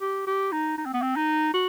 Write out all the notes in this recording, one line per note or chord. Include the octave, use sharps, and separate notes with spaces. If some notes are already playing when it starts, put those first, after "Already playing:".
G4
G4
D#4
D#4
C4
B3
C4
D#4
F#4